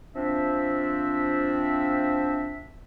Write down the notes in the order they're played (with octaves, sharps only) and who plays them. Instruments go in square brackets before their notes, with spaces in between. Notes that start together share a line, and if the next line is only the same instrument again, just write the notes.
[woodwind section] F3 C4 D4 E5